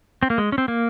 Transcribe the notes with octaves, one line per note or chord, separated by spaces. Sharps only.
C4
A#3
G#3
C#4
C4
A#3